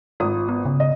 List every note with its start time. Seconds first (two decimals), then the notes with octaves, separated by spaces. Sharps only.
0.20 G#1 F4 D#6
0.49 B3
0.65 C#3
0.80 D#5